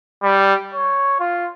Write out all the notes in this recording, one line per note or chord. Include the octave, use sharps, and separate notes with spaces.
G3
C#5
F4